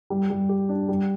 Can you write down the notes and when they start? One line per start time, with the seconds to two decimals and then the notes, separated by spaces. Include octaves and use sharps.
0.10 G3
0.30 G3
0.49 G4
0.69 D4
0.89 G3